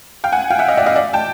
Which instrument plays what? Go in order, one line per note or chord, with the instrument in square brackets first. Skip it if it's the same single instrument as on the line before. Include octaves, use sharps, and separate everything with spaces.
[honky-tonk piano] F5 G5
F#5 G#5
F5 G5
E5 F#5
D#5 F5
D5 E5
D#5 F5
D5 E5
G5 A5